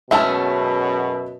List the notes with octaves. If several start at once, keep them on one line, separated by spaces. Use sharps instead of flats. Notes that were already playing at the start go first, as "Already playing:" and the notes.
F#2 B2 G#3 A3 C#4 E5 A5